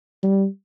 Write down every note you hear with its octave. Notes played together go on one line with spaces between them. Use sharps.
G3